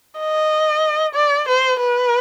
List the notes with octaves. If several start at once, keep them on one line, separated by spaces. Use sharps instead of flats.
D#5
D5
C5
B4